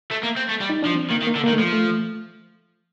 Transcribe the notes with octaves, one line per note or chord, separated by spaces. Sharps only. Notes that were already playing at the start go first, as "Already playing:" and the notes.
A3
A#3
C4
A3
G3
D#4
F3 D4
C4
D#3 A#3
D#3
A#3
D3
D#3 A#3
A3
F3
A3